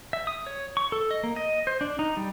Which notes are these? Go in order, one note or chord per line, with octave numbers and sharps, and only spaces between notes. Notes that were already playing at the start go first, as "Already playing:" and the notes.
E5
D#6
C#5
C#6
A4
D#5
A#3
D#5
C5
D4
D#4
G3